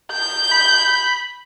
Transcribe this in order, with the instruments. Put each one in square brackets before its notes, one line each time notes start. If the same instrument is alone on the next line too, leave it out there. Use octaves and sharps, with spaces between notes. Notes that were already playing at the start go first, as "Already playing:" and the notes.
[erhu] G6
[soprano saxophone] B5